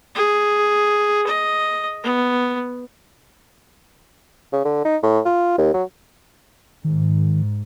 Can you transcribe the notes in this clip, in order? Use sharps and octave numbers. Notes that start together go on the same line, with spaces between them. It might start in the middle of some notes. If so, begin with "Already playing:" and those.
G#4
D#5
B3
C#3
D3
D#4
A2
F4
D#2
F#3
G#2 D#3